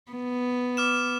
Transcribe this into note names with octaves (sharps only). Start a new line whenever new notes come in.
B3
D6 F6 E7